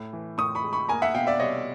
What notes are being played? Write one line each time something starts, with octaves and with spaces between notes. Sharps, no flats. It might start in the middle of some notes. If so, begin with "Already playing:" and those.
Already playing: A2
E3
A2 C#6 D#6
B5 C#6
G#3
B5 C#6
A#3 G#5 A#5
E5 F#5
B2 F5 G5
D5 E5
C2 C#5 D#5